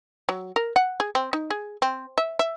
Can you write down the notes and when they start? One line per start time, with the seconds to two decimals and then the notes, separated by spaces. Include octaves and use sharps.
0.29 F#3
0.56 A#4
0.76 F#5
1.00 G#4
1.15 C4
1.33 D#4
1.50 G#4
1.82 C4
2.18 E5
2.39 E5